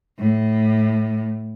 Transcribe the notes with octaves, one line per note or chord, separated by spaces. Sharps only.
A2